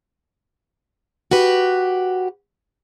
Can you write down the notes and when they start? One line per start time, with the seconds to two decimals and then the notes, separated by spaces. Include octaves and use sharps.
1.31 F#4 G4 B4